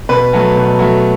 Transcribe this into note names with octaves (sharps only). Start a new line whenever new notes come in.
B2 B4
F#3 A3
B2
F#3 A3